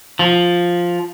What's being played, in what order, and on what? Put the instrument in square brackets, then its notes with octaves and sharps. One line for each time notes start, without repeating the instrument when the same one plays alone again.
[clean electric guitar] F3